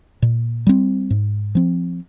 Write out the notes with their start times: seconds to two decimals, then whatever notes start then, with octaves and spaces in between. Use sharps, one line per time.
0.22 A#2
0.67 G3 C4
1.10 G#2
1.55 F3 C4